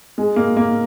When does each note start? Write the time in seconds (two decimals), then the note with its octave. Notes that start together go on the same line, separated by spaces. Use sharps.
0.18 G#3
0.36 A#3
0.57 A#3